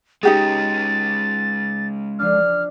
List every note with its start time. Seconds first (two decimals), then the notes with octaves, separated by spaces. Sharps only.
0.23 G#3 C#4 D#4 G4 G#4 A6
2.19 F3 D4 F6